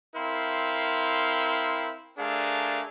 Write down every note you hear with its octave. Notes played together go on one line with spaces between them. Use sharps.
C4 E4 A#4 F5 C6
A3 D4 G#4 A#4 F5